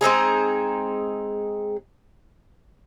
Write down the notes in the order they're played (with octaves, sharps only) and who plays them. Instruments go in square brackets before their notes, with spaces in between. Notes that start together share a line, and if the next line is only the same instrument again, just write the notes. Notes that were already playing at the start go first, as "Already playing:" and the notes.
[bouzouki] G#3 C4 D#4 G#4